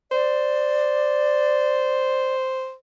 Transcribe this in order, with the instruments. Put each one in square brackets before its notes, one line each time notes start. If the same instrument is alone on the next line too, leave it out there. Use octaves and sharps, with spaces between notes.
[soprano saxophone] C5 [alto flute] D5